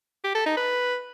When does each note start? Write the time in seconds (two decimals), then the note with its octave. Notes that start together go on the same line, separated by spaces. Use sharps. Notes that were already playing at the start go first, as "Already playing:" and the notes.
0.24 G4
0.35 A4
0.46 D#4
0.57 B4